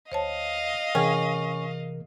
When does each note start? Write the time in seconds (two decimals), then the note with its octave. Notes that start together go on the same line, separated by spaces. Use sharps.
0.12 D2 C5 C#5 D#5 F5 A5
0.95 C3 E3 C#4 G#4 A#4 F#5 G5